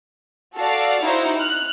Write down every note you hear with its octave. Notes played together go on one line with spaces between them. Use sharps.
F#4 A4 D5 F5
D#4 E4 F#4 C5
F6 F#6